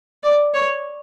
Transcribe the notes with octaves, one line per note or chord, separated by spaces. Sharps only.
D5
C#5